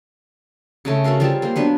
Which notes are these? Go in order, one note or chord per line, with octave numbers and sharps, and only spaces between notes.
C#3 G#3 A3
F#4 A4 A#4 F5
F3 G3 G#4 A5
A#3 C5
F#3 B3 D4